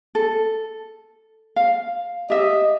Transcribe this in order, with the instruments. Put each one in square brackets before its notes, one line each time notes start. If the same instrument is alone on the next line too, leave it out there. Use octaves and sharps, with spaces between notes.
[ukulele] A4
F5
[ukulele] G4 E5 [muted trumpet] D#5